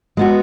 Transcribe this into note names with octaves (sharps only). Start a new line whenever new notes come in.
G#3 B3 F#4